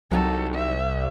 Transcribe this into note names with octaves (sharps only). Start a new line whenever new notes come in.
C2 F#3 D#4 G4 A4
E5